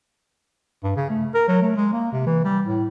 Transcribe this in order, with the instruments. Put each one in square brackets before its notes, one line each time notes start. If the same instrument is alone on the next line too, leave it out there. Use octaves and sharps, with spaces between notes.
[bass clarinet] G2
C#3
A3
A#4
F#3
A3
G#3
A#3
C3
E3
G3
A2